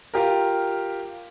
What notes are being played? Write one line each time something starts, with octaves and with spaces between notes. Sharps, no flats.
F4 G4 A#4